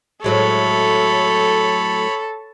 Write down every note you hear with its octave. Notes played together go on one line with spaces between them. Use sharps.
A2 F#3 G#3 A4 C#5 B5